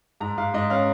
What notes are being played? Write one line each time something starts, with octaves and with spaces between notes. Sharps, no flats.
G#2 A#5
G#2 F5
G#2 D#5
C#4 F5